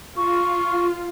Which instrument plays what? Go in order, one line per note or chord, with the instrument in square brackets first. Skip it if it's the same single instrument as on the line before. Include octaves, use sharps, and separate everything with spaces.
[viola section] F4 [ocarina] C#6